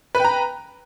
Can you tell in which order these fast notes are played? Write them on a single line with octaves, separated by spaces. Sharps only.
B4 G5 A#5